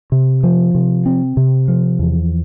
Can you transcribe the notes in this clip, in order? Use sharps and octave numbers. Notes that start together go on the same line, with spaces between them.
C3
F3
C3
C4
C3
F3
E2